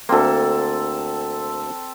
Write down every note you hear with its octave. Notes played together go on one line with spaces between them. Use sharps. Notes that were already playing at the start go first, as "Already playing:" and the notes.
D2 A#3 C4 A4